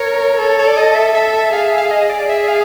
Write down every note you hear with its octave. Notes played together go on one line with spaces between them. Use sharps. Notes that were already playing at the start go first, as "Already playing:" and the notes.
Already playing: A#4 C#5
A4
C#5
D5
D#5
E5
A4 E5
E5
G#4 F5
E5
F5
D#5
D5
G#4 E5
F5